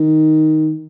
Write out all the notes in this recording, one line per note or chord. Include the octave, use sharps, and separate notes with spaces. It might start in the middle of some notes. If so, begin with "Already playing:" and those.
Already playing: D#3